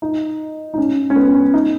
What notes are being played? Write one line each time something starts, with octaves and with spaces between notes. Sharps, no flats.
D#4
D#4
C#4
C#4
B3
C#4
D#4